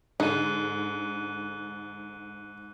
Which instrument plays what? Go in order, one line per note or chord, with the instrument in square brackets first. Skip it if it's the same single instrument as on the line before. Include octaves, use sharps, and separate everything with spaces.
[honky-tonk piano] G#2 [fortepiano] D3 [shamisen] D#4 [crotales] F#6 D#7